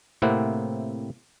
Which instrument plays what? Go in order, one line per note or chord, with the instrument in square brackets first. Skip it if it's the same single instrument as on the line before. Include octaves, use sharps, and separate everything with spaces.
[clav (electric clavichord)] A2 C3 A#3 C4 E4 F#5